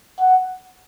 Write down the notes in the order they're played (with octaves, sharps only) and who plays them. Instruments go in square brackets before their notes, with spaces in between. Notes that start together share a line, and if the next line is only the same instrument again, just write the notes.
[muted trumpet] F#5